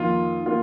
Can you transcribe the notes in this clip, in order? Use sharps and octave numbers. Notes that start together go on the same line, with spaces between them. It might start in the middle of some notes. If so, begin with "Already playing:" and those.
Already playing: F2 D#3 A#3 F4
D#3 A#3 F4